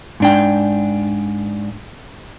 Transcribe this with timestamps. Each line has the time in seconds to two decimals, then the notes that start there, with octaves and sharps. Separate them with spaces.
0.20 G#2 D4 G5